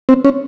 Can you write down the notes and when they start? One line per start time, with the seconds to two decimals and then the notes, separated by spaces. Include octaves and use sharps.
0.09 C4
0.25 C#4